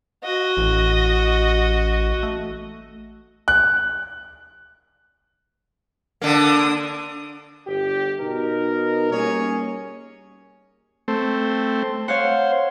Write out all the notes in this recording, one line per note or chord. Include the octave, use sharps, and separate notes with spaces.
F#4 D#5
A1
A3
F#6
D3 A#3 D4 D#6
G1 G4
B2 D#4 A#4
G3 A#3 C#4 G#4 C#5
A3 C4
C5 C#5 F5 F#5